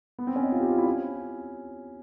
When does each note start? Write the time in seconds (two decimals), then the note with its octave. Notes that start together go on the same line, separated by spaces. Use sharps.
0.19 B3
0.27 C4
0.36 C#4
0.43 D#4
0.52 F4
0.60 G4
0.68 F4
0.78 E4
0.86 C#4